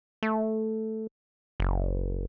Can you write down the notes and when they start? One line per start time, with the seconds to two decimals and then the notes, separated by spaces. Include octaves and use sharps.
0.23 A3
1.60 F#1